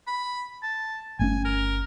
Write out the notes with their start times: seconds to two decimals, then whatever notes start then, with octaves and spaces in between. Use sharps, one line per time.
0.07 B5
0.63 A5
1.19 G1 A3 C#4 G#5
1.45 A#4